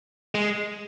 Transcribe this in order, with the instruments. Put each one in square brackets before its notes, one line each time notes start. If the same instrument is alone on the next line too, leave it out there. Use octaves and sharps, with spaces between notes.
[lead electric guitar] G#3